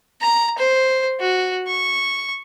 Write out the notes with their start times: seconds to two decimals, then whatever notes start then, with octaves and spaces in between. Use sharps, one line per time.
0.21 A#5
0.58 C5
1.20 F#4
1.67 C#6